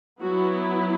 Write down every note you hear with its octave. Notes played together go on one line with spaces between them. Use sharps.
F#3 B3 E4 F#4